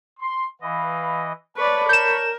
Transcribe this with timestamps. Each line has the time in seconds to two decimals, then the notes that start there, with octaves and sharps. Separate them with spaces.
0.19 C6
0.62 E3 B4 D#5 F5 B5
1.57 B4 C#5 D5 A5 B5 C#6
1.89 A#4 G6 E7